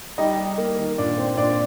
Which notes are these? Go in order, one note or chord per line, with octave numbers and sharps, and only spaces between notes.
G3 D#4 D#5
G3
A#3
D#3
A#2 D4 D5
C4
A#2 D4 D5